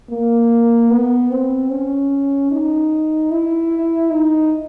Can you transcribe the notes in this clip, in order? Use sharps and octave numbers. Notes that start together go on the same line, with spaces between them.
A#3
B3
C4
C#4
D#4
E4
D#4